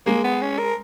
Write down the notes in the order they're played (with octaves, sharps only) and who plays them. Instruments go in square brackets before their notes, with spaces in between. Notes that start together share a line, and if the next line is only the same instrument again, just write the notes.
[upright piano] G#3 [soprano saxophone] A#3
[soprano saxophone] B3
C#4
A#4